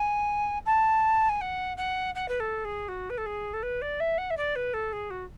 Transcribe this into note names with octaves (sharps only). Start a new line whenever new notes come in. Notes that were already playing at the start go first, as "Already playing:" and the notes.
Already playing: G#5
A5
G#5
F#5
F#5
F#5
B4
A4
G#4
F#4
B4
A4
G#4
A4
B4
D5
E5
F#5
E5
D5
B4
A4
G#4
F#4